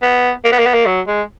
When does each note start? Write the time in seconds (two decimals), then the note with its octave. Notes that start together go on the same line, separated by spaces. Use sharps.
0.02 B3
0.45 A#3
0.52 B3
0.59 A#3
0.66 B3
0.74 A#3
0.86 F#3
1.07 G#3